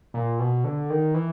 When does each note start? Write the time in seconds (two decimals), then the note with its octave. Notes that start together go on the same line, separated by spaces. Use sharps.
0.14 A#2
0.39 B2
0.64 D3
0.90 D#3
1.14 E3